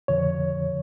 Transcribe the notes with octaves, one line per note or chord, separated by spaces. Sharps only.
F2 D3 F3 C#5